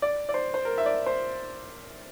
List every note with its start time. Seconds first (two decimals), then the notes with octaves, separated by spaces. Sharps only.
0.02 D5
0.29 D5
0.34 C5
0.54 C5
0.65 A#4
0.78 E5
0.86 D5
1.06 C5